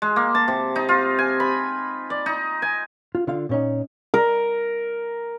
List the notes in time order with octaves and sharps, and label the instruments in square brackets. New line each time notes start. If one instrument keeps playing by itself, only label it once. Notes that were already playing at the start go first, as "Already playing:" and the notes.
[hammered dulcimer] G#3
A#3
A5
C3
D#4
F4
G#5
B5
D5
D#4
G#5
[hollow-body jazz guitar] F4
D3 F4 F5
A#2 C#4 D#4
[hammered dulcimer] A#4